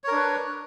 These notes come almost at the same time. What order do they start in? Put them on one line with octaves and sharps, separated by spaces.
C#5 A#4 D4 B4